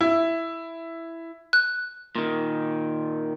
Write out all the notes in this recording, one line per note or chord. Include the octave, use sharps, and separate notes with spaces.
E4
F#6
A#2 D#3